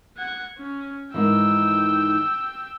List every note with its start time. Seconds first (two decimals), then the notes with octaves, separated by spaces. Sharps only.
0.18 F#5 G#6
0.58 C#4
1.14 G#2 D#3 E3 G5 E6